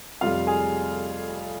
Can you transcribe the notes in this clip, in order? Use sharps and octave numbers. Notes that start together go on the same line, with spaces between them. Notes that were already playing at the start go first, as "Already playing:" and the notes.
F1 F2 C3 G3 F4 F5
G#4 G#5